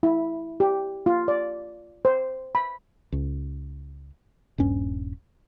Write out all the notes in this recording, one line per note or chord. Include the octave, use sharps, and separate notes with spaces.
E4
G4
F4
D5
C5
B5
C#2
D#1 G2 C#4